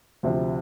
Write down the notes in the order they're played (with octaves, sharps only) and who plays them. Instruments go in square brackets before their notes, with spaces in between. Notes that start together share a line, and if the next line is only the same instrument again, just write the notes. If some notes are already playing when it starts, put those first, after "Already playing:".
[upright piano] D2 C3 F3